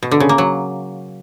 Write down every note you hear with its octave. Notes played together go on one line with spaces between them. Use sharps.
B2
D3
C#3
A#3
F#3